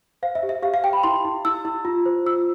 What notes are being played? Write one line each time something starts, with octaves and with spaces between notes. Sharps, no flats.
C5 F5
E5
G4
E5
G4 F5
F5
G4 G5
B5
E4 C6
E4
E4 E6
E4
F4
C5
F4 E6